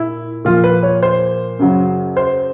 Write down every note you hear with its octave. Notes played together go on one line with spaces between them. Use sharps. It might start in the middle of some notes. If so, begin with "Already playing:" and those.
Already playing: A#2 E4
A#2 F3 F4
B4
C#5
C5
F#2 C#3 F#3
C5